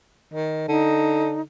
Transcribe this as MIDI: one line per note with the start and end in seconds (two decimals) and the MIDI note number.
0.33 0.66 51
0.68 1.44 50
0.68 1.41 63